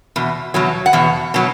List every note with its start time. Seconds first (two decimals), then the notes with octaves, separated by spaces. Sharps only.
0.16 E2 B2
0.54 E2 B2 F#3
0.86 F#5
0.93 E2 B2
1.34 B2 F#3